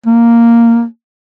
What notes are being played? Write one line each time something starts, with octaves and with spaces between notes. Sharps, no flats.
A#3